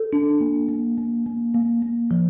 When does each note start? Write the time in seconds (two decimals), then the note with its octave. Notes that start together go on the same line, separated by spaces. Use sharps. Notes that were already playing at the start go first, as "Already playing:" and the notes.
Already playing: A4
0.13 D4
0.40 A#3
0.69 A#3
0.98 A#3
1.26 A#3
1.54 A#3
1.82 A#3
2.11 F3